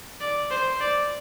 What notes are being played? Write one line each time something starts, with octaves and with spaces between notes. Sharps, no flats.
D5
C5
D5